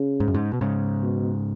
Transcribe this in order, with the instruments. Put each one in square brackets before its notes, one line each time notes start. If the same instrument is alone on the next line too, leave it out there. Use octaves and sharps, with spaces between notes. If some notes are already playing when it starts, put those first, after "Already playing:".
Already playing: [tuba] C#3
[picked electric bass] G#2
F#2
G#2
B2
G#2 C#3
[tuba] B2